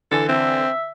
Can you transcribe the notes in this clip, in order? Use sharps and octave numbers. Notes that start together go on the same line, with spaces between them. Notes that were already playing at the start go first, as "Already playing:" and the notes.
D3 E3 A4 G#5
C4 E5